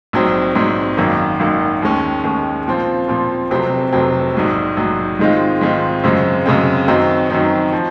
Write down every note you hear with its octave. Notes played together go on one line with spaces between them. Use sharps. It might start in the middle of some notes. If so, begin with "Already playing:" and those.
A#1 G#2 F#3 C4
A#1 G#2 F#3 C4
G#1 F#2 D#3 A#3
G#1 F#2 D#3 A#3
D#2 D#3 G#3 C#4
D#2 D#3 G#3 C#4
A#2 F3 C4 F4
A#2 F3 C4 F4
F1 F2 C3 F#3 C4
F1 F2 C3 F#3 C4
A#1 G#2 F#3
A#1 G#2 F#3
G#2 D#3 G#3 C4 F4
G#2 D#3 G#3 C4 F4
F#2 C#3 G#3 C4
F#2 C#3 G#3 C4
F#2 D#3 F#3 C4 D#4
F#2 D#3 F#3 C4 D#4
F3